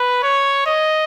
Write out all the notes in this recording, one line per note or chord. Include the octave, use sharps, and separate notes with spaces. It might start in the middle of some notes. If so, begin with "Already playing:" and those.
Already playing: B4
C#5
D#5